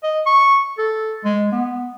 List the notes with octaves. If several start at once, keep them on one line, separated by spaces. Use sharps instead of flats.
D#5
C#6
A4
G#3
B3